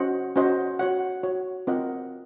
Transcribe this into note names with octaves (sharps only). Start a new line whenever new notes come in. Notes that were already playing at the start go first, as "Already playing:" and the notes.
Already playing: C#4 F#4 C5 D#5 F#5
C#4 F#4 C5 D#5 F#5
F#4 C#5 F#5
F#4 C#5 F#5
C4 F4 A#4 D#5 F#5